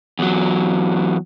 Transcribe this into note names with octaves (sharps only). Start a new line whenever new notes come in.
E2 F#3